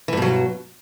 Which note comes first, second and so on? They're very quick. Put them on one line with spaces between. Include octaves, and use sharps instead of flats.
E3 G2 B2 F#3